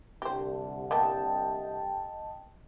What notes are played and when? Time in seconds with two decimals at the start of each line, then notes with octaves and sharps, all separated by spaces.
0.22 C2 D3 G4 C5
0.91 A#3 B3 A4 D#5 G5 A5